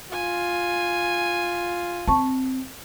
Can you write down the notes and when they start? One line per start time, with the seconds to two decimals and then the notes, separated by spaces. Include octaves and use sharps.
0.12 F4 G#5
2.07 C4 A5 C#6